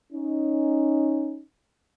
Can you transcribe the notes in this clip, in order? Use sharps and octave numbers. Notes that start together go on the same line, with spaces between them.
C#4 D#4